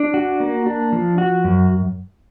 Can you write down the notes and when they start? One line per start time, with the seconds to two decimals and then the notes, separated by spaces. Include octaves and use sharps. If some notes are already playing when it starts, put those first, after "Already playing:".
Already playing: D4
0.14 F#4
0.40 A#3
0.66 D4
0.92 F3
1.18 F#4
1.44 F#2